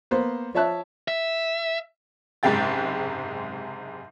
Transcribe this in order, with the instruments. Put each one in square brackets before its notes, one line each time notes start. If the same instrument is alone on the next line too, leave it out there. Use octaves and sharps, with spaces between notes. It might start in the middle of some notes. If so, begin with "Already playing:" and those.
[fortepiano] A#3 B3 C5
F3 C#5 E5 A5 F#6
[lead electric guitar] E5
[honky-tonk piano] F#1 G#2 C3 G#3 G5 A6